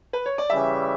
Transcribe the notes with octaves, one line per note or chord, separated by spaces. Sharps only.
B4
C#5
D5
C#3 E3 G3 E5